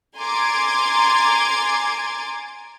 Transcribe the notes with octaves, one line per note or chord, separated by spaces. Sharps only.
G#5 A#5 C6 D6 G#6 A6